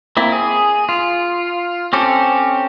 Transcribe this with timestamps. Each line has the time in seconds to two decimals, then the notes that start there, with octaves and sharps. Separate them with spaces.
0.17 A#3 C4 E4
0.32 G#4
0.89 F4
1.93 C4 C#4 G4 A4